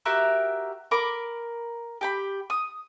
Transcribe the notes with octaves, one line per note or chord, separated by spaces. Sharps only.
F#4 G4 A#4 E5
A#4 B5 D6
G4 G5 B5
D#6